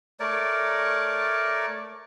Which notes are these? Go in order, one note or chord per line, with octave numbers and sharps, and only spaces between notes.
A3 A#4 C#5 D5